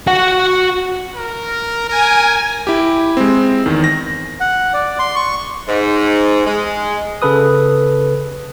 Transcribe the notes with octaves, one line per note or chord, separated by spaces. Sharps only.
F#4 F#5
A#4
A#4 G#5
E4 G4
G#3 C4
E2 D#3
A#6
F#5
D5
C6
C#6
G#2
G#3
C#3 A4 B4 D#6